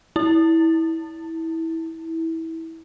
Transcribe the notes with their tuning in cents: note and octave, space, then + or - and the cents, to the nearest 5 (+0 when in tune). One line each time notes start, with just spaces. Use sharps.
E4 -20